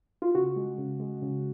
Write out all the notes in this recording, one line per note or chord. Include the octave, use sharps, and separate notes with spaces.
F4
C#3 F#4
G#3
C#3
G#3
C#3